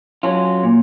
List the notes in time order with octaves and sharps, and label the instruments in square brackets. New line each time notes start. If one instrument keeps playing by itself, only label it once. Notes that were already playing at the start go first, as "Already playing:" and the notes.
[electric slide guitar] F#3 C#4 F4
A#2